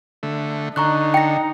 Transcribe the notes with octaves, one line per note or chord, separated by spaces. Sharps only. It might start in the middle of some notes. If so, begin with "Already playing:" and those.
D3 A3
D3 D#4 A#5 C#6 F#6
G5 A#6 C#7